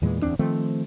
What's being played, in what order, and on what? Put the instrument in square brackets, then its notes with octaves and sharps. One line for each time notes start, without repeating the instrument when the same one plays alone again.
[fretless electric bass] E2 A#2 E3 G#3
D1 E2 C4 D4
D#3 F3 A3 C4